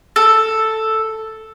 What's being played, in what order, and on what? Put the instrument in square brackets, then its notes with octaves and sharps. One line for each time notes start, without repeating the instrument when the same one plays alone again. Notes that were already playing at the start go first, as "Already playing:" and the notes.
[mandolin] A4